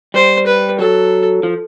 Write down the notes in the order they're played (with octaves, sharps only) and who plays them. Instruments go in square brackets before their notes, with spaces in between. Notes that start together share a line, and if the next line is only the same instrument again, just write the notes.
[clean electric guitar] G3 [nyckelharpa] C5
[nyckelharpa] B4
[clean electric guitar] F#3 [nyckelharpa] A4
[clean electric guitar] F3